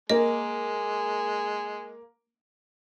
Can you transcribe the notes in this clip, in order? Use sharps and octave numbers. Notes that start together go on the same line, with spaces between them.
G#3 A#3 D#5